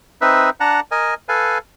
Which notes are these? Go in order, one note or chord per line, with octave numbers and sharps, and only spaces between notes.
C4 D#4 B4 E5
D4 F#5 A5 A#5
A#4 D#5 G#5
A4 B4 F5 G#5